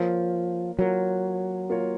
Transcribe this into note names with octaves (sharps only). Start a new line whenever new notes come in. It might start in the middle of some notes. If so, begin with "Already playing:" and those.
Already playing: F3 A#3 F4 A#4 C#5
F#3 A#3 F4 A#4 C#5
A#3 F4 A#4 C#5